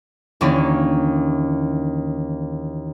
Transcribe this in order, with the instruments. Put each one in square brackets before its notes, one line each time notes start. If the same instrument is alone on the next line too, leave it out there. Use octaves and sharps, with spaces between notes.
[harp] D#2 D3 E3 A#3 C#4 D5